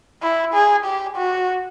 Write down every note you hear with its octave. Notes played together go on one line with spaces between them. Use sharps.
E4
G#4
G4
F#4